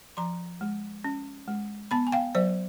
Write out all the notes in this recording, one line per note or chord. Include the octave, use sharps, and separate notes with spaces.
F3 A#5 C6
G#3
C#4
G#3
B3 A5 B5
G#5
F5 G5
F#3 C5 D5